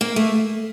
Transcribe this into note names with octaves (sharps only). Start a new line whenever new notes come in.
A#3
A3